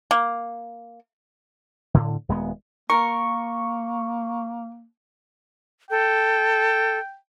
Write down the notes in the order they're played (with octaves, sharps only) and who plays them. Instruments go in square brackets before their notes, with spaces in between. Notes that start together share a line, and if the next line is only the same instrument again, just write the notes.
[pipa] A#3
[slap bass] A2 D3
D#1 G#3 B3
[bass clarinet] A#3 [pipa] A#4 [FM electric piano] C#6
[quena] A4 [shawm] G5